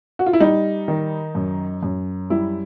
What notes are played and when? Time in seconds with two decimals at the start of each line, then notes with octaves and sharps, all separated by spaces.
0.19 F#4
0.26 F4
0.33 E4
0.40 G3 D#4
0.88 D#3
1.35 F#2
1.83 F#2
2.30 G3 E4